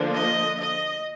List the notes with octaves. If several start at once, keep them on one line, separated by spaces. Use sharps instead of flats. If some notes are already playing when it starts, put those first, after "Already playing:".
Already playing: D3 F3 A#3 D4
D#5
D#5